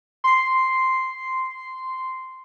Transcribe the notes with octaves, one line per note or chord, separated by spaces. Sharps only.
C6 C7